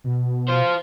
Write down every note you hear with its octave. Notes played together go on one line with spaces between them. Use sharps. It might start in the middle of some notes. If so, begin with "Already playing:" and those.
B2
F4 C5